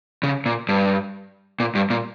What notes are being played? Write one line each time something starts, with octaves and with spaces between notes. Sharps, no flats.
C#3
A#2
G2
A#2
G2
A#2